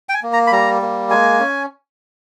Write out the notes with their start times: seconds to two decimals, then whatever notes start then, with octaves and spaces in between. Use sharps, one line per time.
0.09 G5
0.14 G#5
0.23 A#3
0.33 A#5
0.47 B5
0.52 G3 A#5
0.82 A#3
1.10 G#3 G#5
1.40 C#4